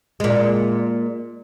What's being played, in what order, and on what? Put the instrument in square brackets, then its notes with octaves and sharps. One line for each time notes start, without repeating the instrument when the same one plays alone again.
[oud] A#2 G#3